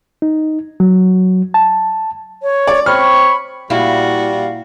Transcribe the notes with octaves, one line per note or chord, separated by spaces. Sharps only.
D#4
F#3
A5
C#5
D5
C4 C#5 B5 C#6 F6
A#2 G3 E4 F#4 F5